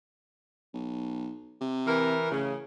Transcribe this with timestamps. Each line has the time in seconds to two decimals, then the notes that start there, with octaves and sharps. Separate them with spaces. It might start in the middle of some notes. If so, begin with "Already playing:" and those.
0.74 B1
1.61 C3
1.87 E3 A#4
2.31 A1 C#3